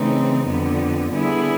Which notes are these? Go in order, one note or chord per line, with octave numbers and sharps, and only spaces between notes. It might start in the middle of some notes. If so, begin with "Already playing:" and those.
Already playing: C#3 E3 A3 C4 D#4
F2 D3 G3 B3
D3 G3 B3 E4 G#4